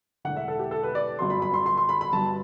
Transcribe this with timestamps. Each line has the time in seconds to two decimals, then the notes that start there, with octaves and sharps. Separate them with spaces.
0.25 E1 E2 D3 F#5
0.36 E5
0.48 A4
0.59 G4
0.71 A4
0.83 B4
0.95 D5
1.19 G1 F#2 F#3 C6
1.30 B5
1.42 B5
1.54 C6
1.66 C6
1.77 C6
1.89 B5
2.01 B5
2.13 G1 G2 F#3 B3 A5